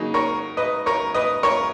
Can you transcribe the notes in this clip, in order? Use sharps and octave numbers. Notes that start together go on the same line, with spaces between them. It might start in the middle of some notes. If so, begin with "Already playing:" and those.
Already playing: C#3 F#3 A#3 D#4
A#4 C#5
B4 D#5
A#4 C#5
B4 D#5
A#4 C#5